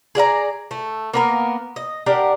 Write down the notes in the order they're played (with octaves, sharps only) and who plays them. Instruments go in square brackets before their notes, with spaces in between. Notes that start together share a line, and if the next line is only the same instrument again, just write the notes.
[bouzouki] G#4 D5 F5 A#5
A3
A#3 B3 A#4
D#5
D4 G4 A#4 F#5